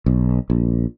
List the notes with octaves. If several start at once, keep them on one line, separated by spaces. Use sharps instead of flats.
B1
A#1